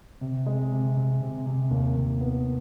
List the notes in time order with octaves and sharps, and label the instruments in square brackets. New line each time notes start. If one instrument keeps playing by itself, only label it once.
[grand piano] C3
G#3
C3
C3
C3
C3
D#2
D#2
B3